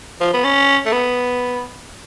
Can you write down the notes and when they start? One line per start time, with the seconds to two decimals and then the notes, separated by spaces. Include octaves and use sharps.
0.21 F3
0.33 B3
0.44 C#4
0.86 A3
0.92 B3